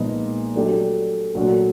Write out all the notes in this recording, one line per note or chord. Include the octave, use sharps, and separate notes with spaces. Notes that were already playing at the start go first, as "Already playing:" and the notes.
Already playing: A#2 F3 G#3 B3 D#4
F#3 A3 D4 G4
A#2 F#3 A3 D4 F#4